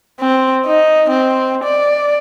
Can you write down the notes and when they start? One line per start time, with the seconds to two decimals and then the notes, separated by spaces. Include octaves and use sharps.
0.20 C4
0.66 D#4
1.10 C4
1.64 D5